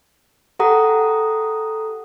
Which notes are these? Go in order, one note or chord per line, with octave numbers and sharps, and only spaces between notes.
G4 A4 F#5 A#5 D#6